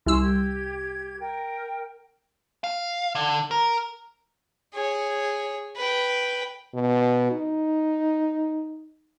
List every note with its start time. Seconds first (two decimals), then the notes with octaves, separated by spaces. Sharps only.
0.06 C2 C#4 C6 E6
0.21 G4 G#6
1.20 A#4 G5
2.64 F5
3.15 D3
3.51 A#4
4.74 G#4 C#5
5.76 B4 G5
6.75 B2
7.32 D#4